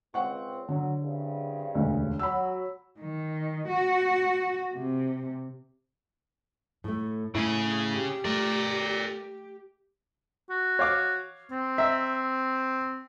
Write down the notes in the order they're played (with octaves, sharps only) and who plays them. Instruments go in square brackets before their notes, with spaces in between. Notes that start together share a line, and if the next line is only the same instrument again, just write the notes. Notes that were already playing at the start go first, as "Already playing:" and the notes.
[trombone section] C#2 C4 [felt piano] F#5 C#6
[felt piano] D3 [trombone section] F#3
[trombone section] C2 G2 C#3
[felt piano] E1 D2
[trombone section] F#3 [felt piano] B5 E6
[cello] D#3
F#4
C3
[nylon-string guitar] A2 A3
[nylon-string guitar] A2 E4 [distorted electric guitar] C#3 G#4
[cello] G4
[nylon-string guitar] A3 [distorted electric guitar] A#4 D5
[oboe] F#4
[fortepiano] C#5 F5 D6
[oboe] C4
[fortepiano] E5 A#5